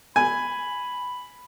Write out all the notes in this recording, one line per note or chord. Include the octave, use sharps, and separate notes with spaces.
G#5 B5